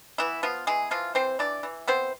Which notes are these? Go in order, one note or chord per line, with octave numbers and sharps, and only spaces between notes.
E3 B3 E4
F3 B3 F4
E3 G#3 G#4
E3 F3 F4
E3 C4 C5
E3 D4 D5
E3
B3 C4 C5